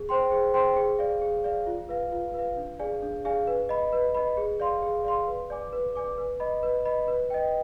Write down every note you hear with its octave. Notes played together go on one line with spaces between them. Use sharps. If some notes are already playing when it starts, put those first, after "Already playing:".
Already playing: G#4
C5 G5 C6
G#4
C5 G5 C6
G#4
D5 F5
G#4
D5 F5
F4
B4 F5
F4
B4 F5
D4
G#4 D5 F5 G#5
D4
G#4 D5 F5 G#5
B4
D#5 B5
B4
D#5 B5
G#4
D5 F5 C6
G#4
D5 F5 C6
B4
D5 G#5 D6
B4
D5 G#5 D6
B4
D#5 B5
B4
D#5 B5
B4
D#5 G5